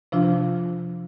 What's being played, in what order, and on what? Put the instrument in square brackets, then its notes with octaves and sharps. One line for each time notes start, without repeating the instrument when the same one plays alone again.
[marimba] C3 F3 D4 F4